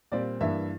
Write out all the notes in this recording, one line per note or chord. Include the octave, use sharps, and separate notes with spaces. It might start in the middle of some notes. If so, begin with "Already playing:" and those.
A#2 G3 C4 D5
G2 E3 A#3 D4 E5